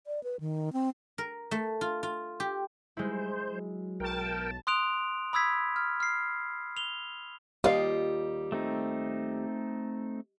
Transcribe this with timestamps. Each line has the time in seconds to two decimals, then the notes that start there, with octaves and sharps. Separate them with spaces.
0.07 D5
0.23 B4
0.40 D#3
0.73 C4
1.18 A#4
1.51 A3
1.81 F4
2.03 F4
2.40 G4
2.97 G3 G#3 E4 C5
3.51 F#3
4.00 B1 A#4 G5 A5
4.67 C6 D#6 F#6 D7 F7
5.33 B5 D#6 E6 G#6 B6
5.76 F6
6.00 F6 C7
6.77 F7 G7
7.64 D#2 G3 F4 G4 D#5 F5
8.52 A3 C4 D#4